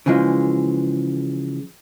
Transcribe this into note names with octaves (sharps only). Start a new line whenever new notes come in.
C#3 E3 F3 G#3